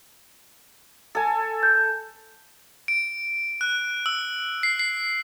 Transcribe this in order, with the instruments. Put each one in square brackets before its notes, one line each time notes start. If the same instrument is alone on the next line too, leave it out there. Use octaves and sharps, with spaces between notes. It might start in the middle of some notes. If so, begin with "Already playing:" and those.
[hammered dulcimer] A4 G#5
[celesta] G6
[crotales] D7
F#6
E6
C7
C7